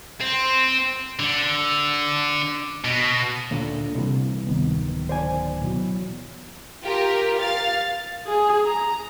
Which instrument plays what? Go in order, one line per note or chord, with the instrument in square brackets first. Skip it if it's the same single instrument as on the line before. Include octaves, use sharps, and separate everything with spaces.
[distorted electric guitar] C4
D3
B2
[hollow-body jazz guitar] D2 A#2 D3
[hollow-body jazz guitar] C2 [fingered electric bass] C3 E3
[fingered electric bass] D1 D#3 B3
[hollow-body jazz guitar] C5 D5 G#5
[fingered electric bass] B2 E3 F#3
[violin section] F4 G4 A#4
F5 A6
[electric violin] G#4
A#5